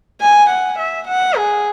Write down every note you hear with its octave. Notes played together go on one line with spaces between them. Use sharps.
G#5
F#5
E5
F#5
G#4